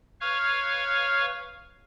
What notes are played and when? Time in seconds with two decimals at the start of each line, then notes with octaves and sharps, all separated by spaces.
0.21 B4 C#5 F5 C#6 F6